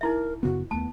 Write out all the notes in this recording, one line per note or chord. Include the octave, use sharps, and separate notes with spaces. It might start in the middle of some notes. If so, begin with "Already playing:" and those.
D#4 E4 A#4 E5
F#2 C#3 B3 F#4
D#2 A3 B3 A5